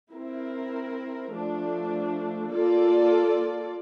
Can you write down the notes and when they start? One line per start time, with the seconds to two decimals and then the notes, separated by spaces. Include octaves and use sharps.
0.12 C4 E4 A#4
1.32 F3 A3 D4
2.51 A#3 F4 A4 D5